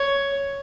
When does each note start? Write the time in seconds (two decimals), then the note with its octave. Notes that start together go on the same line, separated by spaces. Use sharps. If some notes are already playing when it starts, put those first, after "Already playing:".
Already playing: C#5